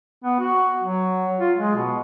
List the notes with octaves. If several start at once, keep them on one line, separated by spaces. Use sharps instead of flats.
B3
F#4
F#3
F4
G#3
B2